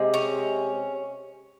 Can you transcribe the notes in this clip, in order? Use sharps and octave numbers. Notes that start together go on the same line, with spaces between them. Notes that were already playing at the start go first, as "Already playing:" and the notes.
Already playing: C3 G#3
C#4